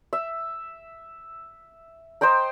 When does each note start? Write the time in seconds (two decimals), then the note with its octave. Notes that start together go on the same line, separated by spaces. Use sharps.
0.13 E5
2.21 C5 D#5 G5 A#5